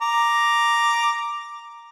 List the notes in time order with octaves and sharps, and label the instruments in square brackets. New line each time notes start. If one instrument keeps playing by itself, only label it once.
[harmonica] A#5 D6